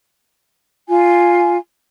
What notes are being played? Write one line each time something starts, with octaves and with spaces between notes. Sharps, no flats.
F4 G#5